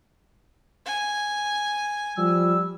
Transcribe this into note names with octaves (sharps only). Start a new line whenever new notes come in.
G#5
F3 G3 E6